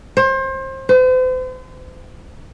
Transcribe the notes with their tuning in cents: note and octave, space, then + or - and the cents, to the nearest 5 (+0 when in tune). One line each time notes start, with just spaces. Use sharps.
C5 +30
C5 -40